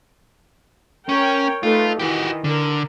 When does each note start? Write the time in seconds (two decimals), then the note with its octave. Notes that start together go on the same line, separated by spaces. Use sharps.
1.09 C#4 A#4 C#5 G5
1.63 A3 D#4 F4 B4
1.99 D#3 E3 F#4 G4 D#5
2.44 D3 A#4